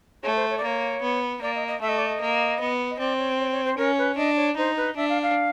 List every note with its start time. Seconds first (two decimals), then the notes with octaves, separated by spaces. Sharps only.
0.23 A3 C#5
0.36 C5
0.50 C#5
0.58 D5
0.63 A#3 C#5
1.02 B3
1.42 A#3 D5
1.55 D#5
1.68 D#5
1.81 A3 E5
1.89 D#5
1.98 D5
2.06 D#5
2.21 A#3
2.60 B3
2.91 D#5
2.99 C4 D5
3.18 C#5
3.39 C#5
3.52 C#5
3.65 C5
3.78 C#4 A#4
3.98 B4
4.17 D4 D#5
4.36 C#5
4.57 D#4 C5
4.77 B4
4.96 D4 E5
5.09 F5
5.22 F5